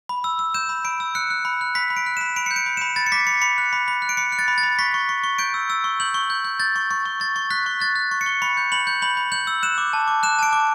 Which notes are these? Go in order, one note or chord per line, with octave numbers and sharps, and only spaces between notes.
B5
E6
E6
G6 E7
B5
B5 D7
E6
F#6 C#7
F#6
B5
F#6
B5 B6
B5
D7
F#6
E7
B5
B5 D7
G6 C#7
D7
B5
E7
B5
B5 A6
C#7
D6 B6
B5 C#7
B5 C#7
F#6
B5
B5
F#6
D7
B5 C#7
F#6
A6
B5
A6
B5
C#6 B6
C#6
C#6
C#6
G6 D7
E6
E6
C#6
G6 F#7
C#6
G6
G6
G6 A6
C#6
C#6
C#6
C#6 A6
C#6
F#6 B6
C#6
F#6 A6
F#6
C#6
C#7
C#6
B5 C#7
G6
B5 F#7
G6
B5 F#7
B5
G6 F#7
E6
F#6 E7
D6
A5
D6
F#6 E7
A5 D7
D6